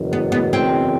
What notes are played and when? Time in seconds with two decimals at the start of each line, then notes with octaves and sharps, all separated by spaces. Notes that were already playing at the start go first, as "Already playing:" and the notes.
Already playing: F#1 E2 B2 F#3
0.13 B3
0.32 B3
0.53 C4